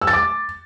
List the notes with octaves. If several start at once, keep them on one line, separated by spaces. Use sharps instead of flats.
E6
A6
D6